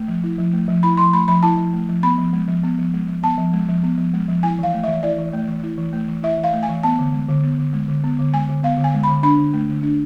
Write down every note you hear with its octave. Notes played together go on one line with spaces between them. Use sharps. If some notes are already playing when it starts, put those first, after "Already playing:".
Already playing: A3
F3
E4
F3
A3
F3
E4 B5
F3 C6
A3 B5
F3 B5
E4 A5
F3
A3
F3
B3 B5
F3
G#3
F3
B3
F3
G#3
F3
B3 A5
F3
G#3
F3
B3
F3
G#3
F3
E4 G#5
E3 F5
A3
E3 E5
E4 D5
E3
A3
E3
E4
E3
A3
E3
E4 E5
E3
F5
A3
G#5
E3
B3 A5
D3
G#3
D3
B3
D3
G#3
D3
B3
D3
G#3 G#5
D3
B3 F5
D3
G#5
G#3
D3 B5
D4 B5
D3
A3
D3
D4